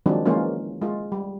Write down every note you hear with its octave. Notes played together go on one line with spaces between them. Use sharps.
D#3 F3 F#3 G#3 C4 D4
E3 F3 G#3 A#3 C#4 F4
G#3 F4
G3